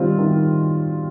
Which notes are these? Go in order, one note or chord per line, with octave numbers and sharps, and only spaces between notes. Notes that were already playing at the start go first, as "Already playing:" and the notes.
Already playing: D#3 G3 C4 F4
D#3